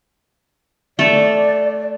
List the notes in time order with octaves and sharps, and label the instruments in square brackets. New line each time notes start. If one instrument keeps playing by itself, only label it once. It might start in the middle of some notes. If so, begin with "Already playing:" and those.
[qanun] A3 A4 [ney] D5